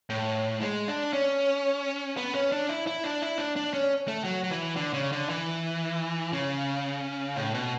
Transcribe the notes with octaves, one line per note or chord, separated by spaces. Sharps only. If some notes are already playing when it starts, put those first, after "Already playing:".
A2
G#3
D4
C#4
B3
C#4
D4
E4
E4
D4
E4
D4
D4
C#4
A3
F#3
F#3
E3
D3
C#3
D3
E3
C#3
A2
B2